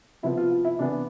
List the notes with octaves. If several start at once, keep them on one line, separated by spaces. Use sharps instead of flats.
C3 F3 B3 E4
F4
F4
E4
C3 E3 B3 D4